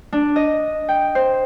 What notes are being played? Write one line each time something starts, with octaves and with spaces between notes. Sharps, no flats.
D4
D#5
G5
C5